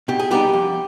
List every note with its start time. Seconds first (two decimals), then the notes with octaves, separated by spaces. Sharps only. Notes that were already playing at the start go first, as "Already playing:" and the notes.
0.08 B2 G4
0.20 G#4
0.31 G3 B3 D#4 G4
0.53 F2